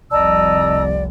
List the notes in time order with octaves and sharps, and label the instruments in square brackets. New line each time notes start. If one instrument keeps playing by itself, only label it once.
[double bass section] F1 C2 [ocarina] D5 [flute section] D#5 A5 A#5 [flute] E6